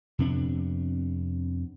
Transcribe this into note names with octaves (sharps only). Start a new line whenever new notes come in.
F2 C3 B3 D4